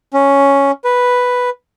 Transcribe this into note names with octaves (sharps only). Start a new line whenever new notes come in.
C#4
B4